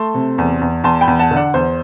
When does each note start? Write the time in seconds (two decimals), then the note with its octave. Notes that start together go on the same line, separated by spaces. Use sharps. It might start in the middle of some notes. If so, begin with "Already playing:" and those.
Already playing: A3 A5 C6
0.14 C3
0.38 E2
0.61 E2
0.84 E2 A5 C6
1.01 G5 B5
1.08 E2
1.19 F#5 A5
1.31 D3
1.36 D5 F#5
1.54 E2 C5